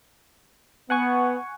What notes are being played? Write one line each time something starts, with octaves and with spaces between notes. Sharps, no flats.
B3 F#5 G#5 C#6